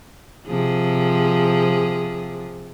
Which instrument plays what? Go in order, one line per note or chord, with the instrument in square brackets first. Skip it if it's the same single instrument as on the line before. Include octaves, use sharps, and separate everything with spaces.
[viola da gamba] C3 F3 G#4